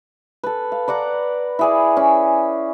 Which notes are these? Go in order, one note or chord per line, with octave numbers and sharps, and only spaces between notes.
A4 B4
F5
B4 D5 F#5 A#5
E4 G#4 D5
C#4